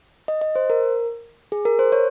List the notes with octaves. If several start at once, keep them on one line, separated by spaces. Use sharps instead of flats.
D#5
D#5
C5
A#4
G#4
A#4
C5
C#5